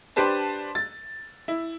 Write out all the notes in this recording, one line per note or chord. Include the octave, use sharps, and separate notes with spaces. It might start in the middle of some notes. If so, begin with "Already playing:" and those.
D4 G4 B4 C5 A5
A6
E4